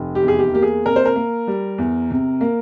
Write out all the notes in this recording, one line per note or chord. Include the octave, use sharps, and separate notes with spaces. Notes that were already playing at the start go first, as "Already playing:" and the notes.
Already playing: F1
G4
E2
G#4
G4
A#3 G4
G#4
C3 A#4
C5
A#4
A#3
G3
E2
C3
A#3